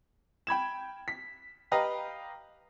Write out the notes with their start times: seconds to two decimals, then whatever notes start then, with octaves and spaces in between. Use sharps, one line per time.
0.47 G5 B5 G#6 E7
1.08 B6
1.72 G4 B4 D#5 F5 G5 A#5